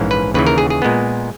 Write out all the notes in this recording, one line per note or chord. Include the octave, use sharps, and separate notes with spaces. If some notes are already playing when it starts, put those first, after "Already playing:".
Already playing: A#1 G#2 E3 A#3 C#4
B4
D#2 C#3 E3 B4
A#4
G#4
G#4
A#2 G#3 B3